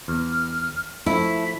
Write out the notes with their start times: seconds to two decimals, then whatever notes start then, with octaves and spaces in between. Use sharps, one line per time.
0.08 E2 F6
1.06 F3 A3 E4 B6